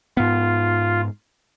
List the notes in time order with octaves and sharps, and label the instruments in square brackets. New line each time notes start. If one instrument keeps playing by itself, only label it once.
[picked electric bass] G#2 B3 [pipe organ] F4